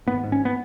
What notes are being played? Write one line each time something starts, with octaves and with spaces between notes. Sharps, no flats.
G#1 B3
G#2
C#4
B3